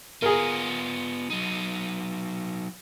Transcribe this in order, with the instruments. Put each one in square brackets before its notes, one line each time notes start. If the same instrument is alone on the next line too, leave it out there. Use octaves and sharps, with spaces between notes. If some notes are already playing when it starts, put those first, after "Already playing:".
[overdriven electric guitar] B3 F4 [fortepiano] G#4 A#4
[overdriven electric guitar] F#3 D#4